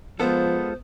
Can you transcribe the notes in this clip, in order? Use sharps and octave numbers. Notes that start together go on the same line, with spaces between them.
F3 G#3 B3 F4 A4 C5